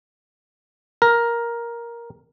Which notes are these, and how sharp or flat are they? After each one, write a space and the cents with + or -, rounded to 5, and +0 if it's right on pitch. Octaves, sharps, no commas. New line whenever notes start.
A#4 +10